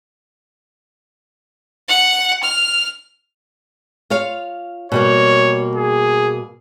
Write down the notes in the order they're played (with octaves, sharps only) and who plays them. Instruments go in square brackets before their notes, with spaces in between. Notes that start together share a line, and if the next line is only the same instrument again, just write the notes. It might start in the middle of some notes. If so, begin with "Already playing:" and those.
[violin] F#5
F6
[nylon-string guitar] F4 C#5 F5
[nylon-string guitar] B2 G3 A#3 [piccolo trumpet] C#5
[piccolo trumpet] G#4